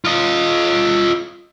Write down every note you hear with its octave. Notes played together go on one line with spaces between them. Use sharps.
F4 D#5